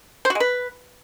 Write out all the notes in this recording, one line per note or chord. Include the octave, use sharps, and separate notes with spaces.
C5
F#4
G#3
B4